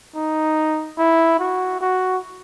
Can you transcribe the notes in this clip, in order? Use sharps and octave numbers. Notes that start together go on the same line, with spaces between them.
D#4
E4
F#4
F#4